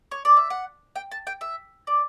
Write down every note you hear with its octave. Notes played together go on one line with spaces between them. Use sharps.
C#5
D5
E5
F#5
G5
A5
G5
E5
D5